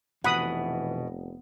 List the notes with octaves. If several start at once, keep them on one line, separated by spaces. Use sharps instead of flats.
F1 B2 E3 F#5 B5 D#6